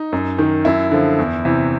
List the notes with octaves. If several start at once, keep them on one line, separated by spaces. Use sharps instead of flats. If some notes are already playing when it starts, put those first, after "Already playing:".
Already playing: D#4
F#2
D#3
F#2 E4
D3 F3
E2
C3 E3